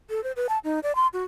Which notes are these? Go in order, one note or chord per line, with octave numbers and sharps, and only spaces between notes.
A4
C5
B4
A5
D#4
D5
C6
F#4